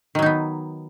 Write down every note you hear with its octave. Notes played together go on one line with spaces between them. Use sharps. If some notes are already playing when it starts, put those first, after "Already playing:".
D#3 F#3 B3 D#4